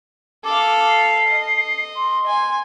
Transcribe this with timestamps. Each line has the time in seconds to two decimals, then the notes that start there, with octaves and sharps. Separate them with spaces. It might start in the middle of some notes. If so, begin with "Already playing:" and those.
0.44 A4 F5 D6
0.87 C7
1.28 D#5
1.95 C6
2.26 G#5